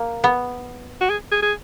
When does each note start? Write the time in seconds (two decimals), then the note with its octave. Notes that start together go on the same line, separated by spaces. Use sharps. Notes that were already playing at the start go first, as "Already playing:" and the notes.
Already playing: A#3
0.24 B3
1.01 F#4
1.10 G#4
1.32 G#4
1.42 G#4